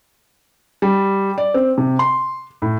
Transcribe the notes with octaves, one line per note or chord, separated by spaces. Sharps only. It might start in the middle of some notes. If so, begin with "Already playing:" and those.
G3
D5
C4
C3
C6
A2